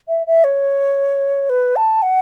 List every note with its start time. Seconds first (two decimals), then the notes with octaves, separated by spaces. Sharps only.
0.08 E5
0.27 E5
0.44 C#5
1.50 B4
1.76 A5
2.02 F#5